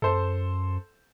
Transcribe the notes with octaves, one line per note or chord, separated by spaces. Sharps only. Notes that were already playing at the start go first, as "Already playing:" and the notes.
F#2 A4 C5